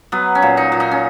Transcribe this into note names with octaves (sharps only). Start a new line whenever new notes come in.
F#3 B3
C#4
A#2
D#4
A#2
D#4
C#4